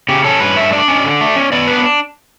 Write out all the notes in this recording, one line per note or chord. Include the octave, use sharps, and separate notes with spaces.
C#3 G4
C#4 A4
G2 B4
A3 E5
D4 D5
C#4
D3
A3
C#4
B3 D5
D4 B4